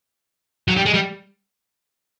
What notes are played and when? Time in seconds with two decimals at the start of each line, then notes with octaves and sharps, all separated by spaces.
0.68 F#3
0.76 G3
0.86 G#3
0.94 G3